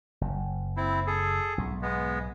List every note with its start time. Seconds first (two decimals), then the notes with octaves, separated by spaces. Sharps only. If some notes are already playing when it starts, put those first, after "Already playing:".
0.21 F#1
0.77 C4 E4
1.07 G#4 A4
1.58 B1 G#2
1.82 G#3 B3